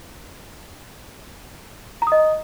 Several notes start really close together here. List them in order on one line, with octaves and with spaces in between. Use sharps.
A#5 D#6 D#5